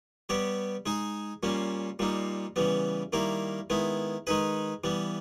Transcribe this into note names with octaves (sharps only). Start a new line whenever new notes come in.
G3 B3 G4 C#5
G#3 D#4 G#4
A#2 G3 A#3 C#4
A#2 G3 A#3 D#4
C#3 E3 G3 B3
D#3 G3 A#3 E4 A#4
D#3 G#3 B3 E4
D#3 G#3 D#4 G#4 B4
E3 G3 B3